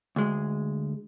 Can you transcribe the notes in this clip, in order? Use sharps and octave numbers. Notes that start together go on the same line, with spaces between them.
D2 G#3